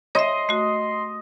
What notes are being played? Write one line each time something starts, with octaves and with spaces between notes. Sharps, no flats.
C#5 D#5 E5 C6
A3 F#4